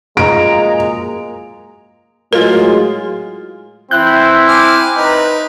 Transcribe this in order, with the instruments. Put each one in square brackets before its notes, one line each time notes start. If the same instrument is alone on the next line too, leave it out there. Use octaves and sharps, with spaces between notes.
[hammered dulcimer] F#2 A#2 F3 [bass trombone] G#3 [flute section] A#5 [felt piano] D7
[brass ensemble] A2 F#3 G#3 [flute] F4 [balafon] A#4
[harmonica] E3 [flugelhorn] C4 [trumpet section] E4 [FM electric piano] F#6 G6
[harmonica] G#5 D6 F6
[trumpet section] C4 B4 A#5 [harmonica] D#4